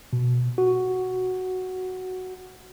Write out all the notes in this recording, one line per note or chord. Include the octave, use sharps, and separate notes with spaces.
B2
F#4